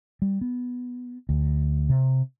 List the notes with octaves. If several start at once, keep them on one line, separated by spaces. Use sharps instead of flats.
G3
B3
D2
C3